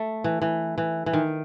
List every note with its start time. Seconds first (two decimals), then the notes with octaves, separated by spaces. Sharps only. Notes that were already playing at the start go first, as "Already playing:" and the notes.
Already playing: A3
0.24 E3
0.42 E3
0.78 E3
1.06 E3
1.13 D#3